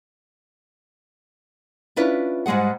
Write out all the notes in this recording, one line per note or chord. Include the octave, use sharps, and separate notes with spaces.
C#4 D4 E4 F4 B4
G#2 G3 G#3 G#4 F#5